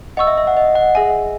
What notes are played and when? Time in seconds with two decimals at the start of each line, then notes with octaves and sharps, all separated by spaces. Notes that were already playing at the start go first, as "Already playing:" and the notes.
0.17 D#5 F#5 C#6 E6
0.27 E5
0.37 E5
0.47 F#5
0.57 D#5
0.75 F#5
0.95 G#4 D#5 E5 G#5